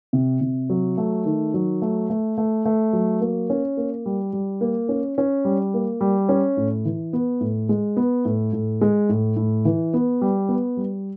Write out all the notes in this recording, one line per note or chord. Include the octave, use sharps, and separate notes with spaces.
C3
C3
F#3
A3
D#3
F#3
A3
A3
A3
A3
F#3
A#3
C#4
A#3
G3
G3
A#3
C#4
C#4
G3
A#3
G3
C#4
A2
E3
B3
A2
G#3
B3
A2
A2
G#3
A2
A2
E3
B3
G3
B3
G3